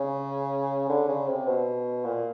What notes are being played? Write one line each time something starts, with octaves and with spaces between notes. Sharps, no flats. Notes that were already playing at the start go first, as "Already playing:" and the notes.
Already playing: C#3
D3
C#3
C3
B2
A#2